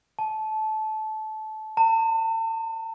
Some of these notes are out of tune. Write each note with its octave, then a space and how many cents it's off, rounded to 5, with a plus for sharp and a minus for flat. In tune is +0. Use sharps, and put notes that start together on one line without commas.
A5 -20
A5 +40